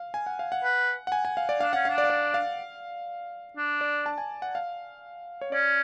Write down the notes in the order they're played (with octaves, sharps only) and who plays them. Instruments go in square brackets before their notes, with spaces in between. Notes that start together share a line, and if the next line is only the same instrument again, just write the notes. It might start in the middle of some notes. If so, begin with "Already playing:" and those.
Already playing: [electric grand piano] F5
G#5
F#5
F5
F#5
[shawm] B4
[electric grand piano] F#5
G#5
G#5
F5
D5
[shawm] D4 [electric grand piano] F5
[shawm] C#4 [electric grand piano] F#5
[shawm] D4 [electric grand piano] F5
[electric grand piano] D5
F5
D5
F5
[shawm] D4
[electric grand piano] D5
A5
G#5
F#5
F5
C#5
[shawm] C#4 [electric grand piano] D5